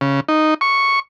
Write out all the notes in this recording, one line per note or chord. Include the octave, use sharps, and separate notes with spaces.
C#3
D#4
C#6